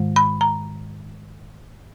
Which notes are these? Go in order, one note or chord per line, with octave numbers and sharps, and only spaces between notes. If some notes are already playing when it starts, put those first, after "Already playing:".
Already playing: G#2 D#3 G#3
B5
A#5